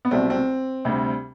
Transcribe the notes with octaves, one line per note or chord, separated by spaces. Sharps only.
B3
C2 B2 F#3 A3 C4
C4
D2 C3 G3